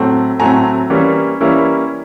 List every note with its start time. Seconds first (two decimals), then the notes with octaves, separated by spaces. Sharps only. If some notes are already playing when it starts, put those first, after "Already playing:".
Already playing: A2 F#3 A3 C4
0.39 A2 F#3 A3 C4 G#5 A#5
0.90 E3 G3 A#3 C#4 E4
1.41 E3 G3 A#3 C#4 E4